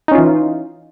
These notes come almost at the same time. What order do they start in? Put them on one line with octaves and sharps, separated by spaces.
D#4 C#4 F4 E3